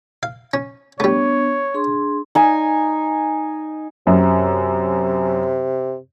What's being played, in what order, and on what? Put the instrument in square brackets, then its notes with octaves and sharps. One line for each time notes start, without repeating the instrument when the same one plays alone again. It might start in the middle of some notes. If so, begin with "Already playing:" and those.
[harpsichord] F5
C#4
[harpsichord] G3 A3 [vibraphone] B3 D4 [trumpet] C#5
[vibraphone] D4 G#4 C6
[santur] D#4 G#5
[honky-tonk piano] F#2 [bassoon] C3